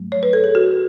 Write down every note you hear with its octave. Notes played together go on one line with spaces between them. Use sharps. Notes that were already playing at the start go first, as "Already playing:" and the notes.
Already playing: G#2 F#3 A3
C#5
B4
A4
G#4
F#4